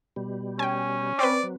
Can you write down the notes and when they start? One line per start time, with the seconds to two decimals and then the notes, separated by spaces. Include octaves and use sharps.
0.16 B2 G3
0.59 C#4 G5 G#5
1.19 C4 B4 D5
1.43 F#3